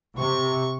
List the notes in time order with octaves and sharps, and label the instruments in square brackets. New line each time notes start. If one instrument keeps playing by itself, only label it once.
[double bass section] C3 [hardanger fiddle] C#6